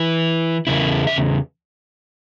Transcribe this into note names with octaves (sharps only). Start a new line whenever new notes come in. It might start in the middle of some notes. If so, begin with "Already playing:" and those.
Already playing: E3 E4
E2 C#3 E4
E5